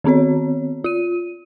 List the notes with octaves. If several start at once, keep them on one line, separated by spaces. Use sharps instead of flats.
D#3 B3 C4 F#4 C#5
F4 D#7